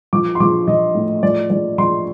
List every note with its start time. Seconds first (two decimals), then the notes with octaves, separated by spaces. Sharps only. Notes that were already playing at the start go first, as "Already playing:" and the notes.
0.13 F3 D6
0.35 C6
0.40 F3 D6
0.68 F3 D#5
0.95 A2
1.23 F3 D5
1.50 F3 D5
1.78 F3 C6